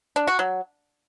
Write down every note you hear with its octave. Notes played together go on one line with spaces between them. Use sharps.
D4
F#4
F#3